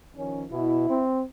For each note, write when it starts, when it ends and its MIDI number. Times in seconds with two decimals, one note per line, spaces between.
0.16 0.43 51
0.16 0.43 53
0.16 0.43 61
0.51 0.88 47
0.51 1.02 64
0.89 1.23 60